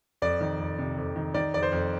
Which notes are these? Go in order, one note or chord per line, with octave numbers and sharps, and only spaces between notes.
F2 D5
D#3
F2
C3
F2
D#3
D#3 D5
F2 D5
C5
F2